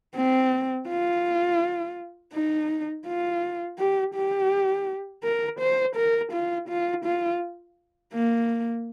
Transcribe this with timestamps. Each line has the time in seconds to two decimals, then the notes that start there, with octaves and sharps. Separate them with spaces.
0.16 C4
0.89 F4
2.34 D#4
3.06 F4
3.79 G4
4.15 G4
5.23 A#4
5.60 C5
5.96 A#4
6.33 F4
6.69 F4
7.05 F4
8.14 A#3